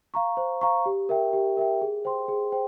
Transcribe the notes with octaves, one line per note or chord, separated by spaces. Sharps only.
F5 A#5 C#6
C5
F5 A#5 C#6
G4
A#4 E5 G5
G4
A#4 E5 G5
G#4
C5 G5 C6
G#4
C5 G5